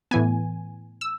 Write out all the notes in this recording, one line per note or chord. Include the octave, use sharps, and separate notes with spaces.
A2 E3 B3 G#5
E6